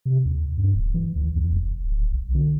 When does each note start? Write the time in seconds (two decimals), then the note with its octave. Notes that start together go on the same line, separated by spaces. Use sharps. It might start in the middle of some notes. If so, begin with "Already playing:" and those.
0.05 C3
0.25 D#2
0.57 G2
0.74 D1
0.94 E3
1.16 D2
1.36 F2
1.52 F1
1.84 D1
2.11 B1
2.34 D3